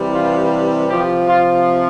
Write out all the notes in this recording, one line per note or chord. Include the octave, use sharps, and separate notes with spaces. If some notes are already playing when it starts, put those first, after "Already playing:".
Already playing: C3 E3 G3
F4
C3 F3 G4
F4